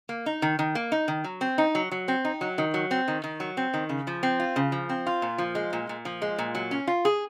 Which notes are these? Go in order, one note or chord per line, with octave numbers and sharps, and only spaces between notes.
A#3
D#4
D#3
D#3
A#3
D#4
D#3
F#3
C4
D#4
F#3
F#3
C4
D#4
F#3
D#3
F#3
C4
D#3
D#3
F#3
C4
D#3
C#3
F3
C4
F4
C#3
F3
C4
F4
A#2
F3
G#3
A#2
A#2
F3
G#3
A#2
F#3
C#4
F4
G#4